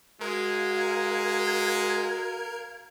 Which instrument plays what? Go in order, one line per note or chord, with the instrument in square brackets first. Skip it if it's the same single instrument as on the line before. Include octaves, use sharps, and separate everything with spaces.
[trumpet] G#3 [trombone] F#4 [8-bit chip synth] A#4 [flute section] F5 G#6